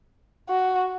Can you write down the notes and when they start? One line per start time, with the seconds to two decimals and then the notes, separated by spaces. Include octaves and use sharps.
0.49 F#4